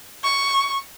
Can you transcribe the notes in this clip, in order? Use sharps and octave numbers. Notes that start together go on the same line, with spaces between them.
C#6